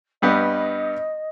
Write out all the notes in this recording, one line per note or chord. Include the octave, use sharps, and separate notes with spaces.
G2 G3 B3 D#5